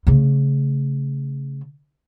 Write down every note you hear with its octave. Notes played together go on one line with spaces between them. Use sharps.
C#3 A3